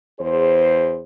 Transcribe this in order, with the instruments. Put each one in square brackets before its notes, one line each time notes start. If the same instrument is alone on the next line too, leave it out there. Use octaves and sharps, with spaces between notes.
[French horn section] E2 G#4 C5